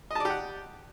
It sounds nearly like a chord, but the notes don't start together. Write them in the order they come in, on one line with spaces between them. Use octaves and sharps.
D#5 A5 D5 G4 F#5